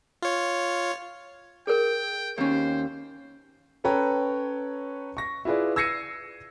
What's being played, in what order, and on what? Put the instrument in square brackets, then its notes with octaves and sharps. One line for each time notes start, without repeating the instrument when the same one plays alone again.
[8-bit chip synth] F4 C#5
[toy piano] G#4 A#4 [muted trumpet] G5
[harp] D#2 C#4 [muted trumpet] C5
[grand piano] C#4 A4 B4 C#5 G5 A#5
C#6 A#6
E4 F4 G#4 B4 D5
E6 G#6 A#6 C7 C#7 D#7